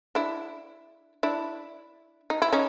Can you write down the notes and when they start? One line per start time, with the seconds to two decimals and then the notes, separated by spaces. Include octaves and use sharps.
0.15 D4 E4
1.23 D4 E4
2.30 D#4
2.42 E4
2.52 C#4 D#4